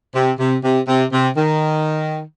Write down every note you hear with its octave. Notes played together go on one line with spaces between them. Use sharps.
C3
C3
C3
C3
C3
D#3